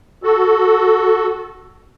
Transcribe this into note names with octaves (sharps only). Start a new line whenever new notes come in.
F#4 A4